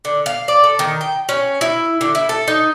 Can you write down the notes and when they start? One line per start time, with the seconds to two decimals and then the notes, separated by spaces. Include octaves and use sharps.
0.05 D3
0.26 F5
0.48 D5
0.64 A4
0.79 D#3
1.01 G5
1.29 C#4
1.61 E4
2.01 D3
2.15 E4
2.29 A4
2.48 D#4